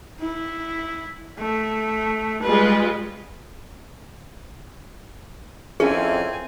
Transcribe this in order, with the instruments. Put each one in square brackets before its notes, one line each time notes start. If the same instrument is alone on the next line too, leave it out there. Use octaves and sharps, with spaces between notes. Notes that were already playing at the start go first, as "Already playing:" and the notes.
[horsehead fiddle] E4
A3
[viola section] G3 G#3 F4 [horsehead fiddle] B4
[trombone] F2 [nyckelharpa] C4 G#5 [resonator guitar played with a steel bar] C#4 E4 A#4 [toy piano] G#4